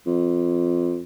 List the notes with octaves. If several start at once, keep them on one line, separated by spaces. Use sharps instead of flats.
F2